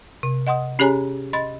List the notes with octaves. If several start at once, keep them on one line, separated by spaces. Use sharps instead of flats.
C3
D#5 F#5 C6 D#6
C#4 G4 G#4 C#5 G#5 A#5
D#5 B5 C6 A6